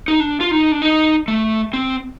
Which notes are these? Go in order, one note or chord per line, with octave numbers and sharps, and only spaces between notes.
D#4
D4
F4
D#4
D4
D#4
A3
C4